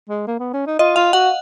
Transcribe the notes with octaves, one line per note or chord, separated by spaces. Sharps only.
G#3
A#3
B3
C#4
D#4
F4 D#5
F4 F5
F#4 F#5